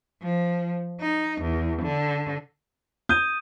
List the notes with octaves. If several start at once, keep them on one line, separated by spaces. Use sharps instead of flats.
F3
D#4
E2
D3
D#6 G6 D#7